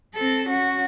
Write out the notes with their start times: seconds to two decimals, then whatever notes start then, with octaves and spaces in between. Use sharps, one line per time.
0.14 C4 A4
0.48 C#4 F#4